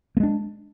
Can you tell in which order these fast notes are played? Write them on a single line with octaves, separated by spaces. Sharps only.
A#3 G#3 D4